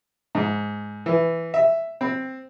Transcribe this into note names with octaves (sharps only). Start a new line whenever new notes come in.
G#2
E3
E5
C4